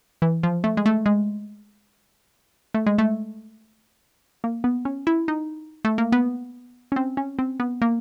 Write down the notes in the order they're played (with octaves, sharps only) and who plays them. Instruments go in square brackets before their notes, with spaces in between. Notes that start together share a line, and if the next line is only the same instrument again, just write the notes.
[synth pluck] E3
F3
A3
G#3
A3
G#3
A3
G#3
A3
A#3
B3
C#4
E4
D#4
A3
A#3
B3
C#4
C4
C#4
C4
B3
A#3